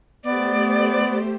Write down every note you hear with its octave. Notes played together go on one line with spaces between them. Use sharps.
A3 B3 G4 C5 D5